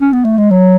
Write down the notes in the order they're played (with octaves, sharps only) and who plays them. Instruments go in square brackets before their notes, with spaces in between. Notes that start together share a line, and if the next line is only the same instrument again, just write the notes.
[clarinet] C#4
B3
A3
G#3
F#3